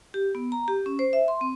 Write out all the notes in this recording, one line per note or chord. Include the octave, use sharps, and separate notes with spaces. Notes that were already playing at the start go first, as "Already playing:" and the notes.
G4
B3
A#5
G4
C#4
C5
E5
C6
C4